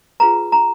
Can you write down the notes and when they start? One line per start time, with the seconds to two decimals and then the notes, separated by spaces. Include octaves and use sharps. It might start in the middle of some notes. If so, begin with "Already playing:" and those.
0.20 F4 G#4 B4 A#5
0.52 A#5